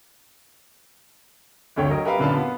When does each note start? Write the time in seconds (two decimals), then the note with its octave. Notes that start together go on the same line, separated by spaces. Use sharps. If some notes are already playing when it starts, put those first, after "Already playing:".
1.76 G1 D2 C#5 G5
1.90 F#3 A#4 D#5
2.05 G4 A#4 B4 E5 F5
2.19 F#2 A#2 D3 B4 F5 A5
2.37 B3